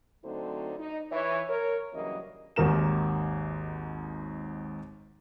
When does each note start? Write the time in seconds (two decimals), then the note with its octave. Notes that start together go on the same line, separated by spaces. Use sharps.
0.25 D3 F#3 A3 C4 D#4 C5
0.79 D#4
1.11 E3 C#5
1.49 A#4 C#5
1.94 G2 C#3 E3 F#3 A#3 D#5
2.56 G#1 D#2 A#4 E7